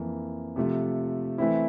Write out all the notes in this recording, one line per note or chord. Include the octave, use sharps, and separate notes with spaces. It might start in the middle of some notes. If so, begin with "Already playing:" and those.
Already playing: F2 E3 A#3
C3 F3 A3
E3 A3 C4 E4